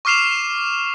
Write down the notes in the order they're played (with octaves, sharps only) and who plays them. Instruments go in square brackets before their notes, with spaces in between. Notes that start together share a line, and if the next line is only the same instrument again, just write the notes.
[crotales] C#6 D6 F6 C7 E7 F7